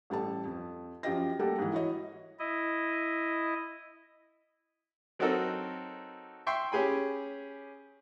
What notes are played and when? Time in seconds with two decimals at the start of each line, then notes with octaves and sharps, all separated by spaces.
0.10 A1 G3 A4 A5
0.45 F2
1.03 F#2 F3 F4 G4 D#5 A#6
1.39 G3 A3 A#3 G4 A4 F#5
1.58 G#2 E3
1.73 E4 F#4 C#5 D#5
2.39 E4 D#5
5.19 F#3 C4 D#4 F#4 A4 A#4
6.47 E5 G5 C6 C#6
6.72 C#4 G4 G#4 G#5 B5